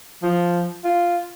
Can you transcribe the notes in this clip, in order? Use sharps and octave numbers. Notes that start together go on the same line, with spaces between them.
F3
F4